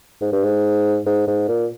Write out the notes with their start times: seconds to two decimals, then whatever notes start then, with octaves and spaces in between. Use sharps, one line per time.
0.21 G#2
0.32 G2
0.44 G#2
1.06 G#2
1.27 G#2
1.48 A#2